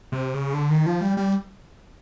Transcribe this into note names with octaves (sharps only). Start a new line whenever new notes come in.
C3
C#3
D3
D#3
F3
G3
G3